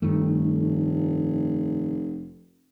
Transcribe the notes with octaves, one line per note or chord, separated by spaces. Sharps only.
F1 G2 D#3 A3